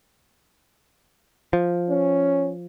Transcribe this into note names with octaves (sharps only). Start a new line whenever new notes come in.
F3
C#4